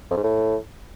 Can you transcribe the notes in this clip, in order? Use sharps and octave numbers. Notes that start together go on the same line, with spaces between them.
F2
G#2
A2